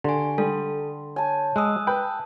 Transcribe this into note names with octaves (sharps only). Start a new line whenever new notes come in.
D3 G4 G#5 C6
G3 A4
C#5 G#5 A5
G#3 D#6 E6 F#6
B4 G5